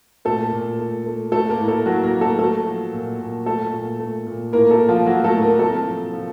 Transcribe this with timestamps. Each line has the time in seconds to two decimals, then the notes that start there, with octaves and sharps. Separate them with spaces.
0.25 A#2 A3 A4
0.53 A#2
0.79 A3
1.06 A3
1.32 A3 A4
1.50 A#3 A#4
1.59 A2
1.68 A3 A4
1.86 A2 F#3 F#4
2.03 A#3 A#4
2.13 F#3
2.21 A3 A4
2.39 A3 A4
2.67 F3
2.93 A#2
3.19 A#2
3.46 A3 A4
3.73 A#2
4.00 A3
4.27 A#2
4.52 A2 A#3 A#4
4.71 A3 A4
4.80 A2
4.88 F3 F4
5.06 F#3 A3 F#4
5.24 A3 A4
5.33 A2
5.42 A#3 A#4
5.59 C3 A3 A4
5.87 F3
6.13 F3